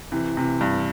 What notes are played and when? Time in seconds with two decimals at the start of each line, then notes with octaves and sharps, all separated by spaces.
0.12 C3 E3
0.37 C3 E3
0.61 G2